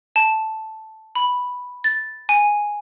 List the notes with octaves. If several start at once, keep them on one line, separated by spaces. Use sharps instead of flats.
A5
B5
A6
G#5